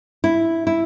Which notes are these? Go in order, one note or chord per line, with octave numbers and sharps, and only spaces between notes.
E4
E4